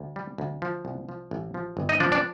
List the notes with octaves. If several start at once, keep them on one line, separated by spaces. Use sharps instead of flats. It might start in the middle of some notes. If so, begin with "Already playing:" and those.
Already playing: D2
G3
D2
F3
C2
F3
A1
F3
G1
D#4 D#5
F3 D4 D5
D4 D5